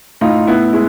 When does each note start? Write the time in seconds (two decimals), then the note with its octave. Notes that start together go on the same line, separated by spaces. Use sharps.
0.21 A2 D#4 F4
0.47 B3 E4
0.73 G#3 E4